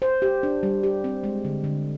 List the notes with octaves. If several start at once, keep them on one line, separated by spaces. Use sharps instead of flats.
C5
G4
D4
G3
G4
C4
G#3
D3
D3